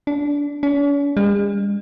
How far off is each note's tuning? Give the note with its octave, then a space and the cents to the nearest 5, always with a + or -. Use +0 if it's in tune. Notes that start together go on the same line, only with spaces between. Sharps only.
D4 -20
C#4 +45
G#3 -45